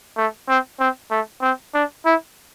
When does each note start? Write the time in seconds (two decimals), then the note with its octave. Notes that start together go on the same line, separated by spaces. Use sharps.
0.17 A3
0.48 C4
0.79 C4
1.10 A3
1.42 C4
1.74 D4
2.05 E4